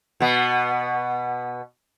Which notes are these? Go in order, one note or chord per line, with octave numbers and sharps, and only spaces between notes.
B2 B3